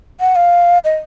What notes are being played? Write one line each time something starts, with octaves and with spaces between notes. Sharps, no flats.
F#5
F5
D#5